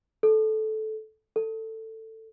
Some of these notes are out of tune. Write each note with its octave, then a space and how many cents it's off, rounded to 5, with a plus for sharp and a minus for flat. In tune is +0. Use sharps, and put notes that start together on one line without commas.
A4 -15
A4 +15